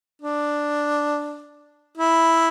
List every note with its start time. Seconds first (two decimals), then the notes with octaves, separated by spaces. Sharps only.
0.22 D4
1.97 E4